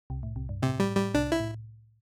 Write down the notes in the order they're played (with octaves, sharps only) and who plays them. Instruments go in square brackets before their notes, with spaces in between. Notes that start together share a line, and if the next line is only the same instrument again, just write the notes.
[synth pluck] C2 C3
A2
C2 C3
G2
[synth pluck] A2 [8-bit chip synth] C3
[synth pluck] A2 [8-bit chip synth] G3
[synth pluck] A2 [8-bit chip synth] G3
[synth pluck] C2 C3 [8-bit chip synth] D4
[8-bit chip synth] E4
[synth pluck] A2